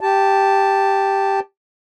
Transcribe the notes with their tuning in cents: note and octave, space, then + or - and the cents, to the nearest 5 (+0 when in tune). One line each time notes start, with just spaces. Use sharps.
G4 +0 A5 +0